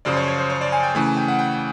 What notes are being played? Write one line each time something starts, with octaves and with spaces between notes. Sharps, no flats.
F#2 C#3 F3 D5
C#5
C#5
C5
C#5
D5
G#5
G5
C#3 E3 A3 G#5
G#5
G5
F#5
G5